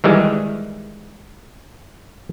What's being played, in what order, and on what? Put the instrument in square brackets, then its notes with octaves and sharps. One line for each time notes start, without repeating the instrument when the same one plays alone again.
[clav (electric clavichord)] D#3 E3 G3 G#3